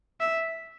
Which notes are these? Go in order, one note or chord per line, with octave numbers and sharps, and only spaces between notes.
E5